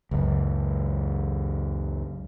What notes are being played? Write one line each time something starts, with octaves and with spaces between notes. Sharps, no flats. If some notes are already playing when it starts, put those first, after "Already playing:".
C#2 F#2